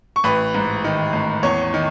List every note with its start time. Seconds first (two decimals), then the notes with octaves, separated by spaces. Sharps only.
0.16 C#6
0.24 A1 B4 B5
0.55 G#2
0.84 D#3
1.13 A1
1.43 E2 C#5 C#6
1.74 D#3